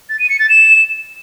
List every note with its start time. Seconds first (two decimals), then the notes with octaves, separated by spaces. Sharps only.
0.09 A6
0.19 D#7
0.29 C#7
0.39 A6
0.49 E7